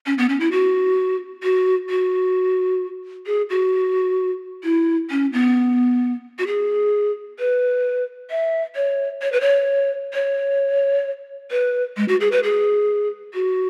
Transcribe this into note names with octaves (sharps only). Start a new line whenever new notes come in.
C#4
B3
C#4
E4
F#4
F#4
F#4
G#4
F#4
E4
C#4
B3
F#4
G#4
B4
E5
C#5
C#5
B4
C#5
C#5
B4
G#3
F#4
G#4
B4
G#4
F#4